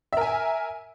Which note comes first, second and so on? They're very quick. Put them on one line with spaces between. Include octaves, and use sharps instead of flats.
E5 A#4 G#5